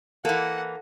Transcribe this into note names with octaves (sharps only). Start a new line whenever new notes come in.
E3 A#3 A4 F#5